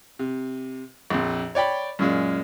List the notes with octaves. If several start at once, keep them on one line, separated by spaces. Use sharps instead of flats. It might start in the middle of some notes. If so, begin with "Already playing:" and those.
C3
A#1 F2
C#5 D5 G5 B5
F#2 A#2 G#3